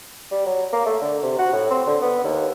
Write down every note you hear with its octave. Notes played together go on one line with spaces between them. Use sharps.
G3
F#3
A#3
A3
D3
C3
F#4
A2
C4
D3
B3
D#2